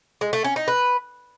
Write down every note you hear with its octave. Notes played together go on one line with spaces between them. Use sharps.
G#3
A3
C#4
D#4
B4